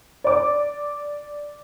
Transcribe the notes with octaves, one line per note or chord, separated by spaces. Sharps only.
D5 D6